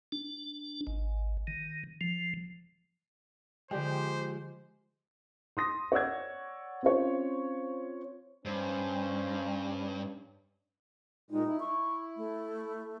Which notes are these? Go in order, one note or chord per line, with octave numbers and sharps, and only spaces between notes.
D4
G#1
D#3
F3
D3 F3 G#3 G4 C5 D5 G5
C6 D#6 A#6
C#5 D5 F#5 E6 G#6
C4 C#4 F4 C5 C#5
G2 C#4 D4 C5
A#2 G3 G#3 D#4
E4
C#6
A3